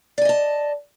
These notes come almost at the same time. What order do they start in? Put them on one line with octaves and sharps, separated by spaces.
D5 G#5 D#5 A5